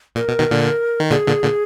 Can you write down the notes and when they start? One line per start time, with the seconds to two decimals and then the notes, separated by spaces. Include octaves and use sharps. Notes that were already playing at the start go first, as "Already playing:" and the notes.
0.15 A#2 A#4
0.28 B2
0.39 B2 D#3
0.51 A#2 D3
1.00 D#3
1.10 A#2 D3 G#4
1.27 A#2 D3
1.43 A#2 D3